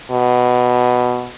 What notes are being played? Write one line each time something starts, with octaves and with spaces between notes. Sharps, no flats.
B2